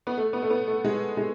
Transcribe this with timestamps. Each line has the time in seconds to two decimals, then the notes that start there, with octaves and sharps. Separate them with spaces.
0.07 B3
0.17 A3
0.33 B3
0.43 A3
0.50 B3
0.67 A3
0.84 G#3
1.17 G#3